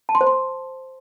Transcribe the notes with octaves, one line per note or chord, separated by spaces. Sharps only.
A5
C6
C5
C6